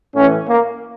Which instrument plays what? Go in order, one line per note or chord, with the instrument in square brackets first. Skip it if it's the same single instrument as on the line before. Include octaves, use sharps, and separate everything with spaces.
[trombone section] A2 E3 C#4
A#3